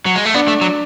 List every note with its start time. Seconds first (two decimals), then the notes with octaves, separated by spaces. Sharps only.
0.06 F#3
0.16 G#3
0.25 A3
0.34 B3 D4
0.48 A3
0.61 F#3